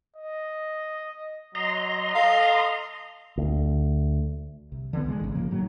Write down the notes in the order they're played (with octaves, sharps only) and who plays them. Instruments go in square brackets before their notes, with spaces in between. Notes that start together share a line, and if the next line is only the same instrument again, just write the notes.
[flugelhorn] D#5
[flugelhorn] F#3 [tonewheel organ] D#5 A#5 C6
[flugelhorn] A4 [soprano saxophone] F5
[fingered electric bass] D2
[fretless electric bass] C2
D3 E3 G3 B3
C2 D#3 G#3
G#1 C#3
C#3 F3 A#3
A2 D#3 F#3